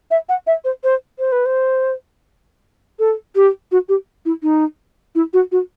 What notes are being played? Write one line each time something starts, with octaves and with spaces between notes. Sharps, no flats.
E5
F#5
E5
C5
C5
C5
B4
C5
A4
G4
F#4
G4
E4
D#4
E4
F#4
F#4